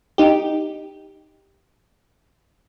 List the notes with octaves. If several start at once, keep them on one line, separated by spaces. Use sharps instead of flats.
D#4 G4